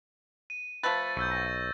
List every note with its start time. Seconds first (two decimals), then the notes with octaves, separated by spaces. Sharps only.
0.50 D#7
0.83 F3 A3 B4 A6
1.17 B1 C#6 E6 G6
1.31 A#6